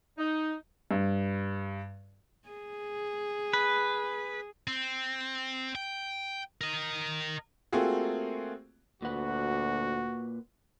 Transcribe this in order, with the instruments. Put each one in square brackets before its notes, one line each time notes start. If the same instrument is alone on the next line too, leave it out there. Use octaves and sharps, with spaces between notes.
[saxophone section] D#4
[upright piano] G2
[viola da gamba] G#4
[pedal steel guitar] B4
[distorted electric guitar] C4
G5
A#4 D#5
[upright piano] A3 A#3 C4 F4 F#4 G#4
[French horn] D2 [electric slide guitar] A#2 B4 F#5 [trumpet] F#4